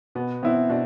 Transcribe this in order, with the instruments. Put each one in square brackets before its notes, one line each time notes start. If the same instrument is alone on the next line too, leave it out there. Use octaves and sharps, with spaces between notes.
[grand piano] B2 [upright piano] B3
[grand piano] B3 E4 [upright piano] C4
[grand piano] B2 [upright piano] D4